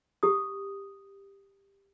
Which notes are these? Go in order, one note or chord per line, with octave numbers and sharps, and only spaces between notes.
G4 D#6